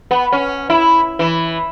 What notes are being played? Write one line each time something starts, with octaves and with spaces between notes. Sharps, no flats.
B3
C#4
E4
E3